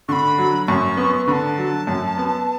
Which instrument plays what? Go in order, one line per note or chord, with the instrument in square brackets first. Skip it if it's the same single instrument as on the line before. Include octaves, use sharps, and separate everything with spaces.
[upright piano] D3 [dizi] B5 C#6
[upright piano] F#3
[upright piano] F#2 [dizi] C#6
[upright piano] B3
[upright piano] D3 [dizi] A5 B5
[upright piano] F#3
F#2
B3